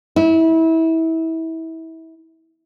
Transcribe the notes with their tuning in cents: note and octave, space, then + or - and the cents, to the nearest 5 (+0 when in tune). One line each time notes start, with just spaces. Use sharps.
E4 -25